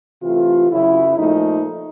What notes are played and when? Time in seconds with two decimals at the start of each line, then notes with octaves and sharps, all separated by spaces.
0.21 C3 E3 A3 F4
0.69 F#2 C#3 F#3 E4
1.17 A#2 F3 A3 D#4